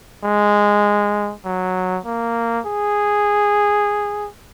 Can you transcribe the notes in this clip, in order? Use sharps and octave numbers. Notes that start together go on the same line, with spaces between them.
G#3
F#3
A#3
G#4